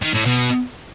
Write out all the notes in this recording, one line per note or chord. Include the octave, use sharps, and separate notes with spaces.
D#3
A2
B2